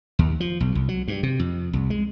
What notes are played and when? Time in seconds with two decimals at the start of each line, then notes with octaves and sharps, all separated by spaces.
0.19 D#2
0.40 F3
0.60 B1
0.75 C2
0.89 F#3
1.08 G2
1.23 C3
1.39 F2
1.73 C2
1.90 G#3